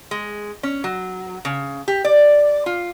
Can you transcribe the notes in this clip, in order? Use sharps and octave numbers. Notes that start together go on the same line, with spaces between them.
G#3
C#4
F#3
C#3
G4
D5
F4